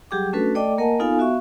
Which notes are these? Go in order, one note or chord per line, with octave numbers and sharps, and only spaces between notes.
F#3 G3 G4 G#4 G5 D6
A3 C#4 D4 F#4 A4 B4
A3 A4 D5 D#5 G5 D6
A#3 A#4 D#5 F#5 G#5 A5
B3 D#4 F4 A4 F5 G#5
B3 F#4 E5 F5 C#6